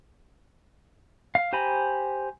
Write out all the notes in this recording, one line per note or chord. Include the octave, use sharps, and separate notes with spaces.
F5
G4 C5 G#5 A#5 B5